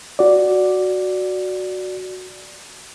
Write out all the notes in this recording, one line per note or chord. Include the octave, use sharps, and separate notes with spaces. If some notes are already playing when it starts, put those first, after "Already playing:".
F#4 D5